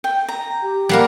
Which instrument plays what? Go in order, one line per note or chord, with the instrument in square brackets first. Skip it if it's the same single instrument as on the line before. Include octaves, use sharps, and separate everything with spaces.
[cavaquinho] G5
A#5
[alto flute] G4
[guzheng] G3 A#3 A#4 [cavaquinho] F#5